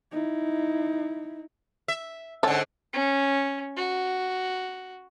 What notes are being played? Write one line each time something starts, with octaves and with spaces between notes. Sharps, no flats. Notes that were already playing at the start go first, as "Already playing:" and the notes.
D#4 E4
E5
G#2 D3 C#4 A4
C#4
F#4